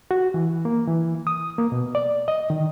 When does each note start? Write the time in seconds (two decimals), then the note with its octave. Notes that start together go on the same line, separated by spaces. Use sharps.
0.11 F#4
0.34 E3
0.65 A#3
0.88 E3
1.27 D#6
1.58 A#3
1.72 B2
1.95 D5
2.28 D#5
2.50 D#3